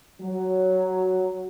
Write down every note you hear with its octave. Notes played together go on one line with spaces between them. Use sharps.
F#3